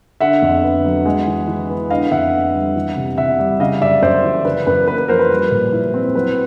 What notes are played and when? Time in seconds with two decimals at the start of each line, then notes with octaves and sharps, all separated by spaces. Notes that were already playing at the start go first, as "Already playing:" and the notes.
0.20 D3 E5 F#5
0.42 F2
0.63 B3
0.85 F#3
1.05 G#3
1.27 E3
1.48 E3
1.70 B3
1.90 D3 D#5 F5
2.12 F2 E5 F#5
2.33 B3
2.54 G3
2.76 E3
2.96 C3
3.17 C3 E5 F#5
3.39 G3
3.60 C#3 D#5 F5
3.81 F#2 D5 E5
4.02 F#2 C5 D5
4.24 E3
4.45 C#3 B4
4.67 F#2 B4
4.87 A#3 B4
4.98 B4
5.08 F3 A#4 C5
5.19 B4
5.30 G3
5.51 A#2
5.73 E4
5.94 C4
6.14 F#3 B4